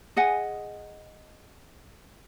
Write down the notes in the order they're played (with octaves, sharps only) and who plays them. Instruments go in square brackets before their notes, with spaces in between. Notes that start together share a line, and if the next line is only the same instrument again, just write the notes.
[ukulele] G#4 D#5 F#5 G#5